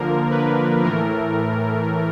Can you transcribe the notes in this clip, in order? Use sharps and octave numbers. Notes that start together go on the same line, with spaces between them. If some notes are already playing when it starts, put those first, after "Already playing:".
Already playing: D3 F3 A#3 A#4
B4
A2 E3 A3 A#4